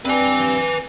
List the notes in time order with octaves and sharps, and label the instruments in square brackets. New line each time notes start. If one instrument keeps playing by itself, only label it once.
[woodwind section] G2 C4 [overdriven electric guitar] B4 G#5